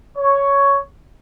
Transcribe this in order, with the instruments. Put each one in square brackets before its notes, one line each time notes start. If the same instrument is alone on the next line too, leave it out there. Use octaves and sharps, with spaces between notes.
[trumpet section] C#5